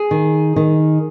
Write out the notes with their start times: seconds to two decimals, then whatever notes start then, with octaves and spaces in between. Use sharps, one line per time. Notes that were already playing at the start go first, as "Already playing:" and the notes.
Already playing: G#4
0.11 D#3
0.56 D#3